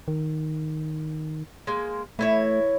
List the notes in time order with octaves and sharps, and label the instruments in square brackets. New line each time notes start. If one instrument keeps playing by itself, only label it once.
[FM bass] D#3
[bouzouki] G#3 A#3
[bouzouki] E3 E4 C#5 [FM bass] A3